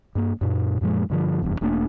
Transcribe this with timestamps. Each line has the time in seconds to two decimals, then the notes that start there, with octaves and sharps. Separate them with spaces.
0.15 G2 A#3
0.41 F#2 A#2
0.81 F#2 A#2 F3 G#3
1.10 G2 D3 F3
1.42 F1 E2 G2
1.61 E1 A3 A#3 D4